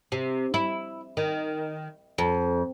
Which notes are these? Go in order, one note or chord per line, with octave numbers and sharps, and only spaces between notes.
C3
E4
D#3
F2